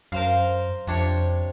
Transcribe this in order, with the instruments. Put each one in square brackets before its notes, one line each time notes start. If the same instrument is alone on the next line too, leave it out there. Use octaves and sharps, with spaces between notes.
[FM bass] F#2 [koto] A#4 C5 F5
[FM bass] F2 [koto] C3 D4 C#5